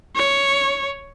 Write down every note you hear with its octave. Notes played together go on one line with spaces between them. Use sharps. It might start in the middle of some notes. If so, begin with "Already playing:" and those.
C#5